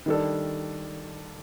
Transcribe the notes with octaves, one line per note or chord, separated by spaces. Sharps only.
D#3 G3 D4 A4